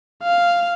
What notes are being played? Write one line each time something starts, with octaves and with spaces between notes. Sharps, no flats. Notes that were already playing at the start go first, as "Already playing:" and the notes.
F5